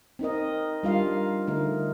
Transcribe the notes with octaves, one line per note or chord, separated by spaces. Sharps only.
C4 D#4 A#4 D#5
G3 D4 F4 A#4 F5
D3 A3 D#4 A#4